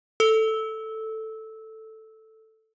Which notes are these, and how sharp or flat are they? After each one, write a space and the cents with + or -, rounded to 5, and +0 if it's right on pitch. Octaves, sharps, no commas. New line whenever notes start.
A4 +5 E6 -15